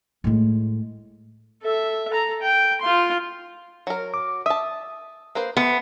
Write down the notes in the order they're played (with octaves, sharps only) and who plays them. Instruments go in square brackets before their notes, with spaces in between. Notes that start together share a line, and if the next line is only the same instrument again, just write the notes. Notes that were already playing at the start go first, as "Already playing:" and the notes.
[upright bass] A2 G#3
[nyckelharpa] A4 E5
A4 A#5
G5
F4 C6
[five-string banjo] F#3 A#4
[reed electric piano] D6
[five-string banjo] E5 A5 [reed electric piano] D#6
[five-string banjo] A#3 B4 C5
[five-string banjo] A3 [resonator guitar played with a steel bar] B3